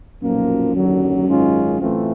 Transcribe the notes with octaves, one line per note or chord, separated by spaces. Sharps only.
B1 F#2 A#2 F3 A#3
D#2 D3 F#3
G#2 D#3 G#3 C#4 F4
A2 E3 A3 C4 F4